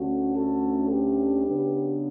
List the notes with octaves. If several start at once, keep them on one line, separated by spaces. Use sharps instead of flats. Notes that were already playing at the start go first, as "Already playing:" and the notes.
Already playing: D2 D3 A3 C#4 F#4
F#4 A4
G4 B4
C#3 F#3 B3 D4